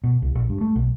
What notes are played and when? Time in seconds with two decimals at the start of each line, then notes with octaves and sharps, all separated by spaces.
0.04 B2
0.22 C2
0.35 A#1
0.49 G2
0.61 A3
0.76 B1